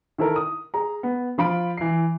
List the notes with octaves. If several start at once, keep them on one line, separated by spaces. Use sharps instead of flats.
D#3 E4 A4 A#4
D#6
G#4 A#5
B3
F3 F4 B5 D7
E3 C7